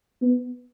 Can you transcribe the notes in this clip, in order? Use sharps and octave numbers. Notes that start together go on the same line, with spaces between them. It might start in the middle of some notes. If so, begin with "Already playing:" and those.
B3